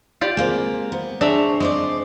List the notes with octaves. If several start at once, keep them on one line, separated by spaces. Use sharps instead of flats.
F4 G4 D5
G#3 A#3 C4
B3
D4 G#4 C5 C#5 E5 A#5
G#3 C4 C5 D5